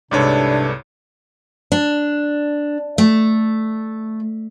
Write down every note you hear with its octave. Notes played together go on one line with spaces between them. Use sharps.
C2 G#2 C3 D4 A4 B4 C#5 D5
D4
A3